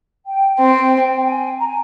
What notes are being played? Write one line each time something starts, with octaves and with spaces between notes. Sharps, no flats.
G5
C4 G5
G5
G#5
A#5
G#5